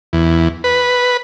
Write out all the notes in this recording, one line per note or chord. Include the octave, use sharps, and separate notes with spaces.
E2
B4